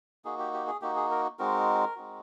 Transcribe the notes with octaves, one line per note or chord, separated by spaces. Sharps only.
A#3 D#4 F#4 G#4
G4
G4
G#4
A#3 D#4 F#4 G4
G#4
A#4
G#3 C4 D#4 F#4 A#4
G#3 C4 D#4 F#4